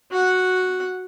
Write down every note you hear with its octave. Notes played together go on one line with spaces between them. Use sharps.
F#4 F#5